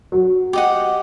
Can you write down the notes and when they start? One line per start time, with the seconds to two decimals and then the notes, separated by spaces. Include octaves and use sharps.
0.12 F#3
0.53 G4 D#5 F#5